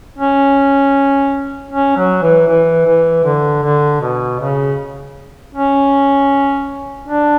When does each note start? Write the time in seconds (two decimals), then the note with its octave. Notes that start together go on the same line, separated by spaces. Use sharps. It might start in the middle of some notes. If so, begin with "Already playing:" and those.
0.18 C#4
1.71 C#4
1.97 F#3
2.22 E3
2.47 E3
2.86 E3
3.24 D3
3.63 D3
4.01 B2
4.39 C#3
5.55 C#4
7.08 D4